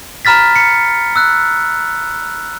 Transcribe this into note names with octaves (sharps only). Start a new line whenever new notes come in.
A#5 B5 F6 A6 B6
C#7
E6 F#6